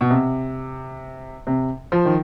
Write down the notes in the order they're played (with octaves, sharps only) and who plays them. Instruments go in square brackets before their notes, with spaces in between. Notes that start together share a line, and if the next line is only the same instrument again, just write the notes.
[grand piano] B2
C3
C3
F3
D#3